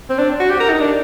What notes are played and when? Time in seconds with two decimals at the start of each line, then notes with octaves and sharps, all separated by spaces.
0.10 C4
0.19 D4
0.40 F#4
0.50 G4
0.60 A#4
0.70 D#4
0.80 D4